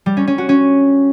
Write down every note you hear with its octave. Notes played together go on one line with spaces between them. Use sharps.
G3
C#4
C#4
F#4
C#4